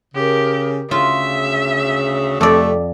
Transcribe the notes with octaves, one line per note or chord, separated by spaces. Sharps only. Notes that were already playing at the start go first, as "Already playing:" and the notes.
C#3 G4 A#4
D2 C#3 F4 E5
F2 C3 A3 D5